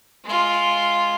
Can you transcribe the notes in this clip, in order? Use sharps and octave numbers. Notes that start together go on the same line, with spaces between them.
G#3 F4